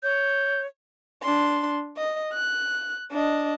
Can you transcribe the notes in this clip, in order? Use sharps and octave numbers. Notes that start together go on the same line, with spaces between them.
C#5 G6
D4 C6
D#5
F#6
D4 D#5